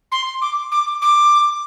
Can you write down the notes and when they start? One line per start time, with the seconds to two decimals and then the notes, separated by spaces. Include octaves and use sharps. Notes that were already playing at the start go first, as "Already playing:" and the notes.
0.12 C6
0.42 D6
0.72 D6
1.02 D6